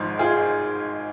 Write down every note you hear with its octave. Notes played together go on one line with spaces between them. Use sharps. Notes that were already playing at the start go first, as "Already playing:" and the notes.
Already playing: G#1 G#2 F3
F4 G#4